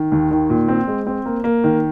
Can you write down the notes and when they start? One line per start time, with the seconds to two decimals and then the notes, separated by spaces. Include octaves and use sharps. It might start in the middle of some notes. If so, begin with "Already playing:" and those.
Already playing: D#3
0.12 D#2
0.31 D#3
0.50 A#2
0.68 C4
0.88 G#3
1.07 C4
1.26 A#3
1.44 A#3
1.64 D#3